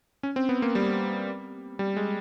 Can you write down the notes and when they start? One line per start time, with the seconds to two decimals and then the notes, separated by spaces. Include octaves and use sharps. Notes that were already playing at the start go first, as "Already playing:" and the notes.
0.23 C#4
0.36 C4
0.49 B3
0.62 A#3
0.75 G3
1.79 G3
1.96 G#3